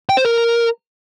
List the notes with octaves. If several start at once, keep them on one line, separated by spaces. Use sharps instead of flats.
G5
C5
A#4